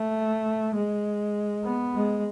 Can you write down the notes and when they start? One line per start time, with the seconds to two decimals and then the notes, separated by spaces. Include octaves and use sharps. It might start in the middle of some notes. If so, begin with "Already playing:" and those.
Already playing: A3
0.75 G#3
1.64 B3
1.95 G#3